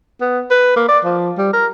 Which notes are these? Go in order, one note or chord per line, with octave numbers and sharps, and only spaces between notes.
B3
B4
A#3
D5
F3
G3
A#4